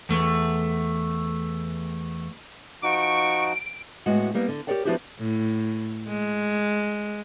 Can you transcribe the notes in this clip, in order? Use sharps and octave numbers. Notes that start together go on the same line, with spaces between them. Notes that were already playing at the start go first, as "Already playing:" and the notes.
E2 A3
F3 D#4 F#4 C#6 D7
A2 G#3 B3 F#4 F#5
G3 A#3 B3
D3
G4 A4 A#4 C#5 D5 G5
F3 B3 D4 E4 F#4 G4
A2
G#3